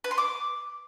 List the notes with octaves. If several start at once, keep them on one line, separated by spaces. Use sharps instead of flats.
B4
C6
D6